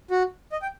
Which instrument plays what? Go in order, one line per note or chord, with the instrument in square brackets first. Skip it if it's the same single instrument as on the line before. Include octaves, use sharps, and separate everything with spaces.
[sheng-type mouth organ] F#4
D#5
G5